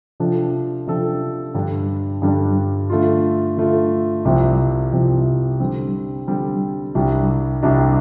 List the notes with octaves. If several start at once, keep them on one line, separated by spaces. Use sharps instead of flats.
C3 F3 D4 A4
C3 F3 D4 A4
G2 D3 G3 D4
G2 D3 G3 D4
D3 A3 F4
D3 A3 F4
C2 C3 F3 C4
C2 C3 F3 C4
D3 G3 C4
D3 G3 C4
C2 C3 G3 D4
C2 C3 G3 D4